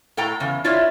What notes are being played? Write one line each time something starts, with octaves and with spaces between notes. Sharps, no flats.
A2 A4 G5 A#5
E2 C#3
E4 F4 C#5 D5 E5